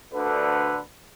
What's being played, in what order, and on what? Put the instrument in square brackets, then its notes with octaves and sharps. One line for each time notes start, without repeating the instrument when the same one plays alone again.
[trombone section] D2 D3 B4